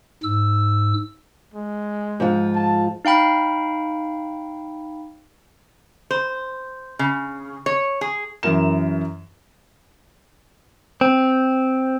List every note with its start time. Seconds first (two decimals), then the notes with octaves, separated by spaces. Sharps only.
0.23 G#2 E6
1.54 G#3
2.20 G#2 F3 F4
2.56 A5
3.05 D#4 F5 G5 B5
6.11 C5
6.99 C#3
7.66 C#5
8.01 G#4
8.43 F#2 E3 A#4 E7
11.01 C4